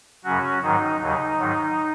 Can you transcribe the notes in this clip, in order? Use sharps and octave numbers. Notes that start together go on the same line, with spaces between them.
F#2 C#3 F#3 C#4 F#4
G#2 D#3 F#3 D#4
D#2 C#3 F#3 D#4
G#2 D#3 F#3